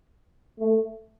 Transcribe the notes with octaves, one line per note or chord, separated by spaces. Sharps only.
A3